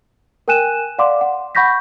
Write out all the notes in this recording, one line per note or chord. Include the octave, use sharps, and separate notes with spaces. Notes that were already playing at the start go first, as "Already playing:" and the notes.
A#4 G5 G#5 F#6 D#7 E7
D5 F5 F#5 C6 D6
F#5
F#5 B5 C#6 G6 A#6 B6